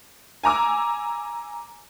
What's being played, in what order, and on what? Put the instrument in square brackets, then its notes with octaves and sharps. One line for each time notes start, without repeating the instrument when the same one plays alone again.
[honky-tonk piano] G#5 A#5 D6 E6